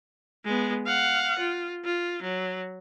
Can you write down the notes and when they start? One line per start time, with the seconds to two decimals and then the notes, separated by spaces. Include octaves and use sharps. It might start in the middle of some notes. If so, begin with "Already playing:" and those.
0.45 G#3 B3
0.86 F5 F#5
1.39 F4
1.85 F4
2.22 F#3